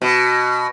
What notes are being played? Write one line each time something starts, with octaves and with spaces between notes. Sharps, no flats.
B2